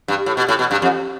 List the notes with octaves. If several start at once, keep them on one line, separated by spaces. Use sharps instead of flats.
G2
A2
B2
A2
B2
G2
F2